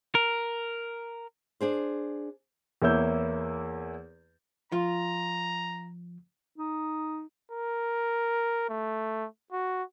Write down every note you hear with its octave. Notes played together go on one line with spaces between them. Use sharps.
A#4
D4 G#4 C5
E2 A#3 E4 C#5 E6 G6
F3 F4 A#5
D#4
A#4
A3
F#4